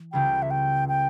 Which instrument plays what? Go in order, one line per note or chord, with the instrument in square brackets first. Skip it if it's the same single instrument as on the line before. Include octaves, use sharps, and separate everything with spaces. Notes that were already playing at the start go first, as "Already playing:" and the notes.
Already playing: [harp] E3
[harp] C#2 C#3 G3 [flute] G5
[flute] E5
G5
G5